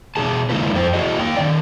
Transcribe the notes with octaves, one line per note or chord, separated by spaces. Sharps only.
B2 E3 G#4 A5
D3 G#3 A#3 E4 F4 B4
F2 A4 C5 G5
F#3 E4 F#4 G#4 D#5
A#3 G5
D#3 F3 D5